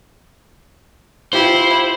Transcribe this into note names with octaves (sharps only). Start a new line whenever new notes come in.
E4 F4 G4 C5